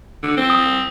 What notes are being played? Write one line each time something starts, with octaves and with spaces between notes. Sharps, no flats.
D3
C4
D#6